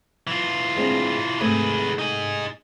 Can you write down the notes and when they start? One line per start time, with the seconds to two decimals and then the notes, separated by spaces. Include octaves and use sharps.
0.27 E3 F4
0.76 G#3 C4 D4
1.41 G#2 C3 A3 G#4 B4
1.99 D#4 G#5